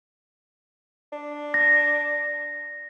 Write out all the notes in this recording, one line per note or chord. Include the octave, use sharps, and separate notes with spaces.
D4
A#6